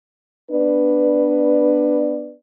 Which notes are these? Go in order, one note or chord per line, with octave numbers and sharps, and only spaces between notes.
B3 D4 B4 D5